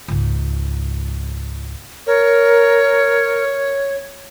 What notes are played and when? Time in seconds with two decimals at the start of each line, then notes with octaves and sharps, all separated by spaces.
0.08 C#2 G#2
2.07 A#4 C#5